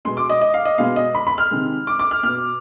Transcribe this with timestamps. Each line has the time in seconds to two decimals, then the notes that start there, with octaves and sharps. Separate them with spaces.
0.05 B2 G#3 B3 C6
0.17 D6
0.29 D#5
0.41 D#5
0.54 F5
0.65 D#5
0.78 B2 G#3 B3 F5
0.96 D#5
1.15 B5
1.27 B5
1.38 F6
1.51 C3 D#3 G#3
1.87 D6
1.99 D6
2.11 F6
2.23 B2 B3 F6